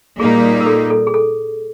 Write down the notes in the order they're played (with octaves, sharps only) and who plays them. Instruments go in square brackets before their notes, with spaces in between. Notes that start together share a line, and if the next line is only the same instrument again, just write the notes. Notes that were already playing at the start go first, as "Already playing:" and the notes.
[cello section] A#2 G3 A#3 D#4 [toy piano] G#4
[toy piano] A#4
A4
A4
G#4
A4